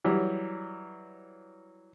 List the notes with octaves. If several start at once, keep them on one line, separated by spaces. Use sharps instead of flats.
E3 F#3 G3